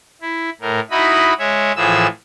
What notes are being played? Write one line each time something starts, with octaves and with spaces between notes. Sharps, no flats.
E4
A2 A#4
D#4 E4 F#4 D#5 B5
G#3 C#5 E5
A2 E3 F3 G#4 E6